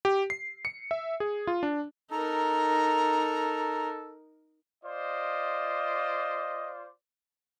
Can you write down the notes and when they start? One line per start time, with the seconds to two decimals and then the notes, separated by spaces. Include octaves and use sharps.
0.05 G4
0.30 C7
0.65 C#7
0.91 E5
1.20 G#4
1.47 F4
1.63 D4
2.11 D#4 A4 A#4 A#5
4.84 F4 C5 D5 D#5